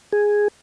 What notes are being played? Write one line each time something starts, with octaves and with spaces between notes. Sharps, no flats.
G#4